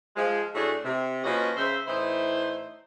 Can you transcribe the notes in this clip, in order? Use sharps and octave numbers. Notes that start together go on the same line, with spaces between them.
F3 G#3
A2 A3 D4 F#4 G#4
C3
F3 A#3 C#4 F#4 B4 D#5
C#3 C5 E5
A2 E3 D#4 E4 C5